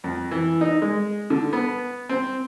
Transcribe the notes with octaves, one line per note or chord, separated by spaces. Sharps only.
F2
E3
D#4
G#3
D3
B3
C4